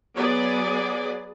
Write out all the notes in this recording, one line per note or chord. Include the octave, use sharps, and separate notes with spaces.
F#3 B3 G#4 D5